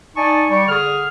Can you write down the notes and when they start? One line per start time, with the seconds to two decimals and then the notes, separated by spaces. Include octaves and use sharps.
0.16 D#4 D5 G#5 A5 C#6
0.50 G3 D5 C#6
0.68 D3 G#4 F6